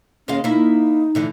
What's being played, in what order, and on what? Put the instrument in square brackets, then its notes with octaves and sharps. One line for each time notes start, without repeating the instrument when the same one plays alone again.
[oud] D#2 G#3 F5 [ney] C#4
[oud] A#3 E4 [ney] D#4
[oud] A2 D3 E3